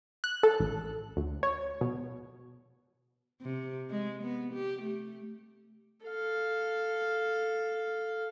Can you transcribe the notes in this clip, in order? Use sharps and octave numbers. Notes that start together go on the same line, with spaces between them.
F#6
A4
A1
D2
C#5
B2
C3
G#3
B3
G4
A3
A4 F5